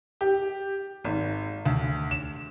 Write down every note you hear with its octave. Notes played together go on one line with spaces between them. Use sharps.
G4
G#1
D2
E7